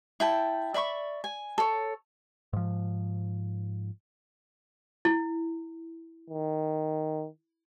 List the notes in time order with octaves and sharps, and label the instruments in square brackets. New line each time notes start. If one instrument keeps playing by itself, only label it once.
[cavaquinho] E4 G5 A5
D5 E5 B5 C#6
G#5
A4 C#5
[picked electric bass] G#2 F3
[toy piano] E4
[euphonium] D#3